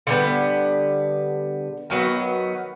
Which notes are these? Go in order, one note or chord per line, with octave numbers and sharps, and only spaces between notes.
D3 G3 B3
D#3 F#3 B3